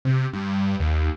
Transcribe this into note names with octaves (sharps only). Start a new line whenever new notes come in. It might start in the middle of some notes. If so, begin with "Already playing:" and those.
C3
G2
D#2